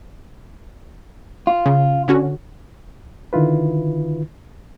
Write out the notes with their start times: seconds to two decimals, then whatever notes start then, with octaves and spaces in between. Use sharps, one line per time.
1.47 F4
1.66 C#3
2.08 D3 C#4 F#4
3.33 D3 D#3 E4 F4 B4